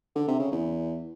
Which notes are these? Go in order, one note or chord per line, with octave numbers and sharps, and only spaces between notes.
D3
C3
C#3
E2